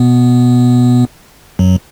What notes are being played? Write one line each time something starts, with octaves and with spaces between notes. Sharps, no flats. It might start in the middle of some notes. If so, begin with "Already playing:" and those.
Already playing: B2 B3
F#2 F#3